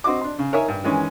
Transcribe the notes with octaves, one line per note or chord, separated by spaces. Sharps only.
C4 F#4 D#5 D6
D4 C6
C#3
D#4 A#4 C#5 E5 G#5
G2
D#3 E3 G#3 C#4